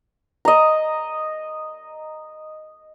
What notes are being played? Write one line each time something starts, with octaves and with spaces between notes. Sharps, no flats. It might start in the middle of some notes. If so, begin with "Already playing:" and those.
D#5 A#5